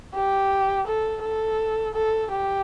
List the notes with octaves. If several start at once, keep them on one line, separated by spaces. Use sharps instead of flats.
G4
A4
A4
A4
G4